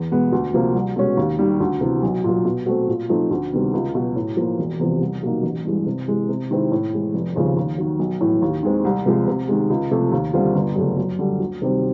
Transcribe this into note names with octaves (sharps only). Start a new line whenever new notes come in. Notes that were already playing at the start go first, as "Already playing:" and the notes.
Already playing: E2
B2 G#3 B3
D2
C3 F3 A#3
C2
B2 G#3 C#4 F#4
D#2
D#3 G3
D2
C3 E3
B1
A#2 F#3
B2
F#3 A3 C4
A#2
F3 A3 C4 D#4
D2
C3 D#3 G3 B3
C#2
B2 F#3
A2
F3 A#3
E1
E2 C3 F3
C2
B2 F#3 A#3 D#4
A1
G2 E3 G#3
C3
E3 G#3
C3
D#3 G#3 C4 E4
A2
E3 G#3
F1
D#2 C#3 F3
D#2
D#3 F#3
B1
A2 E3
D#2
D#3 G#3 C4
C2
C3 F3 G#3
C3
D#3 G#3
C#2
C3 F3 A3
D#2
D3 G3 C4 F4
G1
F#2 C#3 F#3 A3
F#2
D3 G3
D2
C3 D#3 G3 C4